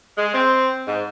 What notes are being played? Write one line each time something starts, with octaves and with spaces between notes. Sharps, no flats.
G#3
C4
G#2